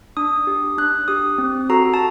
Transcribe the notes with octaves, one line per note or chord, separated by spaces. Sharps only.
D4 D#6
G4
D4 F#6
G4 D#6
C4
F#4 A4 A#5
A5